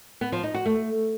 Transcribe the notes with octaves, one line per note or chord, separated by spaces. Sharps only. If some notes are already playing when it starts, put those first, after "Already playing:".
B3
F3
D#4
F#4
A3